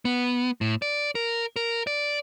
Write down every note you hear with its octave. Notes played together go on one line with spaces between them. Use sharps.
B3
A2
D5
A#4
A#4
D5